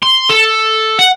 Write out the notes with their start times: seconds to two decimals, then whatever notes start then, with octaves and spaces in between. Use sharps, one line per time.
0.02 C6
0.29 A4
0.99 F#5